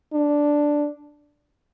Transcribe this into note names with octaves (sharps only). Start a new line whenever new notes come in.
D4